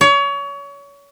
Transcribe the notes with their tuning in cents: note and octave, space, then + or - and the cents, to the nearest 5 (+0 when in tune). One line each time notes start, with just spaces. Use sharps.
C#5 +30